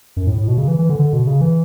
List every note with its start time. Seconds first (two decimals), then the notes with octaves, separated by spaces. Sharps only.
0.17 F#2
0.27 A2
0.38 A2
0.48 B2
0.58 C#3
0.68 E3
0.79 E3
0.89 D3
0.99 D3
1.13 B2
1.27 C#3
1.41 E3